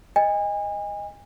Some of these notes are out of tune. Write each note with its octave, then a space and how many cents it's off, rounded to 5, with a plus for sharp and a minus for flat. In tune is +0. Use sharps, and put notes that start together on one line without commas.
D#5 +0 G#5 -35